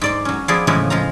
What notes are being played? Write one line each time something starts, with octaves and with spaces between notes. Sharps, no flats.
G#2 D5 C6
F#3 C#4
F3 B3 E4 G#4 D5
A2 C#3 E3 F3 G#3 E4
F3 G#3 F5 A#5